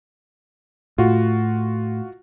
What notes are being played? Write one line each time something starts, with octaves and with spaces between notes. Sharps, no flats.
A2 F4 F#4